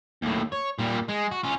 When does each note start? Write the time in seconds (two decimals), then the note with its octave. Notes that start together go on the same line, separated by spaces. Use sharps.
0.22 D#2 A2
0.52 C#5
0.79 A#2 G3
1.08 G#3
1.31 F#4
1.44 C#4 F4